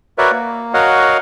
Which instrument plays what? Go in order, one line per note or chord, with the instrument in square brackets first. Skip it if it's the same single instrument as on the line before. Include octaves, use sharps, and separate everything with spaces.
[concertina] F#4 A#4 B4 C#5 D5 E5
A#3
F#4 A#4 C#5 D#5 F5 F#5